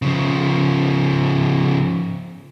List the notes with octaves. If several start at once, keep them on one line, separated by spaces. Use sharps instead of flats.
C#3 F3